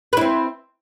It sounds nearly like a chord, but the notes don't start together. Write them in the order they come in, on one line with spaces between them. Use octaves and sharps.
B4 E4 C4